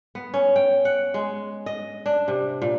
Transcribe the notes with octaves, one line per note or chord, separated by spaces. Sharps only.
B3
C#4
G5
F#5
G#3
D#5
D4
C3
A#2